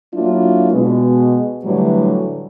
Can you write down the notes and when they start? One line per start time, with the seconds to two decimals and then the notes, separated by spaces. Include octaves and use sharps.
0.14 F#3 A#3 D4 E4 F4
0.73 B2 G#3 B3
1.64 A2 D3 E3 F#3 G3